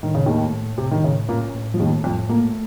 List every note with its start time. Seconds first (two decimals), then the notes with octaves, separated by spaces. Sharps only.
0.03 A2 D#3
0.15 C#3
0.26 D#2 D#3 A3
0.53 A2
0.78 A2 C3
0.91 D#3
1.04 A2 C#3
1.28 A#2 A#3 C#4
1.54 A2
1.74 F3
1.79 D#2 D#3 A3
2.04 F2 A2 F3
2.29 A#2 A3 A#3